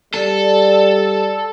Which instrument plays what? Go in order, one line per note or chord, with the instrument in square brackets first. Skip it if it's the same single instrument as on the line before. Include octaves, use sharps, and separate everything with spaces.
[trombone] G3 [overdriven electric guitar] A4